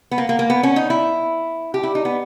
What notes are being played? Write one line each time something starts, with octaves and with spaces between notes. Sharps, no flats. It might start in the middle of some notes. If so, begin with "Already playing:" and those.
B3
A#3
A#3
A#3
B3
C#4
D#4
E4
G4
E4
D#4
B3